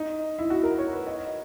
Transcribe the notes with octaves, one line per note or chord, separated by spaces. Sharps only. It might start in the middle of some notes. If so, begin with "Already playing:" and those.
Already playing: D#4
E4
F#4
A#4
C#5
B4
D#5